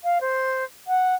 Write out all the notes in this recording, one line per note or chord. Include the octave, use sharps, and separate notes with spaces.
F5
C5
F#5